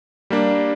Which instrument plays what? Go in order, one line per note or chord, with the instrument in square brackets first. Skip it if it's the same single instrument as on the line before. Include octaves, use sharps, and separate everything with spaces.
[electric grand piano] G3 A#3 D4